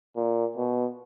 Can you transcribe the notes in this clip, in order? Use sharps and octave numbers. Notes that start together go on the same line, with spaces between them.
A#2
B2